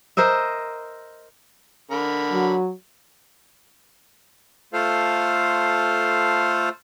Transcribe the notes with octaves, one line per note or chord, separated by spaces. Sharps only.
A#4 C5 D#5 E5
D3 A#4 B5
F#3
A3 F4 A4 C5 F5